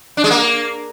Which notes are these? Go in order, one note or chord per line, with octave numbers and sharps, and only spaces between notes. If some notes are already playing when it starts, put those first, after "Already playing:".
D4
G#3
A#3